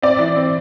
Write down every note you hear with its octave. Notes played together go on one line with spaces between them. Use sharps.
C4 D5
E3
C4